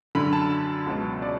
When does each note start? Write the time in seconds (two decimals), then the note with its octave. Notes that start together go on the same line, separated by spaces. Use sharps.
0.15 F#2 D3 F#3 B5
0.33 A5
0.86 C#2 B2 F#3
1.22 D5